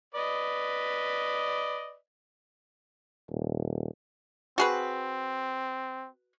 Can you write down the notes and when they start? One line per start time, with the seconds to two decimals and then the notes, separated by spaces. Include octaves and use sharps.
0.15 B4 D5 D#5
3.30 D#1
4.58 C4 F#4 G#4 B4